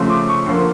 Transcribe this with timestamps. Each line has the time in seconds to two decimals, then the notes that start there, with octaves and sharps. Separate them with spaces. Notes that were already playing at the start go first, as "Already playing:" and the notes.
Already playing: C#3 F3 A3 C6
0.10 D6
0.29 C#6
0.46 D3 F3 A#3 C6